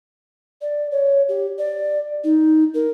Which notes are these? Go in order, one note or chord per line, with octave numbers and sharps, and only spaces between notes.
D5
C#5
G4
D5
D#4
A#4